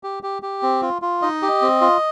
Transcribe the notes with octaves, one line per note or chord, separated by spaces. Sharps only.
G4
G4
G4
C4
F4
F4
D#4 D#5
G4
C4
F4